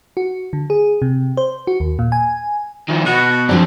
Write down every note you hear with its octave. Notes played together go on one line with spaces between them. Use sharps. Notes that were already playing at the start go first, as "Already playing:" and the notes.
F#4
D3
G#4
C3
C5
F#4
D#2
A#2
G#5
D#3 F3
B2 F#4
F3 F#3 C4 D4 D5